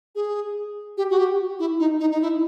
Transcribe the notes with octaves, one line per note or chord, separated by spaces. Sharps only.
G#4
G4
F#4
G4
E4
D#4
D#4
D#4
E4